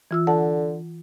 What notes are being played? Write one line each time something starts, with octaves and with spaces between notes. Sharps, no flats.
E3 F4 E6
D3 F#5 A5